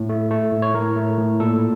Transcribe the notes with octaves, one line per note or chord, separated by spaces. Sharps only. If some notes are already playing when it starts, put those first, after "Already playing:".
Already playing: A2
A3
A3
A2
C#5
A2 A#4
A3
A2
A#2 A4